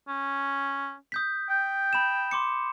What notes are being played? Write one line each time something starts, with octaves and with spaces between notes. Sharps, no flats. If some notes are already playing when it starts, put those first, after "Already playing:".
C#4
D#6 G6 B6
G5
B5 E7
C6 D6 C#7